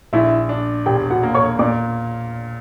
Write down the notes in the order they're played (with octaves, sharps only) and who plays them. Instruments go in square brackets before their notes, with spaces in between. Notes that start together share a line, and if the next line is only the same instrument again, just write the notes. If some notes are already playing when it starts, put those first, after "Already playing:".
[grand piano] A#1 [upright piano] E4 E5
[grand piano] D4
[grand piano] E1 [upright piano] G4 G5
[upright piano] F#4 F#5
[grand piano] A#3
[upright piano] C#5 C#6
[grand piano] A#2 [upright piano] D5 D6